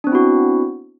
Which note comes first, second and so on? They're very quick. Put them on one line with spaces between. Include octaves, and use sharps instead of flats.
D4 C4 B3 E4 F#4